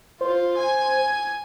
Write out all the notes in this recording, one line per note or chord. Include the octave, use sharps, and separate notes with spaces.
F4 C5
G#5